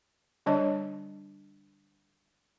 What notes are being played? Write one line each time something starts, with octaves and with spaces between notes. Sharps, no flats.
D3 G3 D4 C#5 D#5 A5